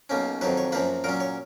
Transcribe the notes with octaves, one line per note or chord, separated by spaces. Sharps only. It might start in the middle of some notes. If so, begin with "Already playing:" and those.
B1 B2 A#3 C#4
F2 D#3 F#3 B4
C#5
F#2 F3 A#3 B4
A#2 F#3 C#4 A#4
C#5